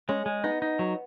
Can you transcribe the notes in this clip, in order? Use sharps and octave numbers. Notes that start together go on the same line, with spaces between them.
G#3 C#4
G#3
B3 D#4
D#4
F#3